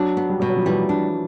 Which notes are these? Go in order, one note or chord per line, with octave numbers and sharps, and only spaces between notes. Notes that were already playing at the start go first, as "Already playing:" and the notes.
Already playing: F#3 D4
B3
G3
B2 G3
F#3
F3
E3 G3
D4